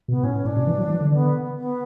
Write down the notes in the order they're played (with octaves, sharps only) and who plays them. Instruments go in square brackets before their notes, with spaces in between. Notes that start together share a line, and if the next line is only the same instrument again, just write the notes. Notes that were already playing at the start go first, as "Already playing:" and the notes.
[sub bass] B2 [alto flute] B3
[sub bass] A2 [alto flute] C#4
[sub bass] A2 [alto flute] D4
[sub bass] B2
E3
F#3
E3
D3
[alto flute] B3
B3